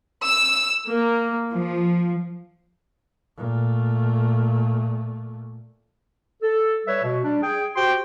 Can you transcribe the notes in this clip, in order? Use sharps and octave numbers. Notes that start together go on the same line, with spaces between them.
E6
A#3
F3
A#2 A3
A4
G3 B4 C#5 E5
B2
G3 D4
G#4 G5
F#4 G4 C5 G5 C6